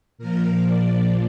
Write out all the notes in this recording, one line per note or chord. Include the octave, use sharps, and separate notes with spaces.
A#2 F3 A#4
D5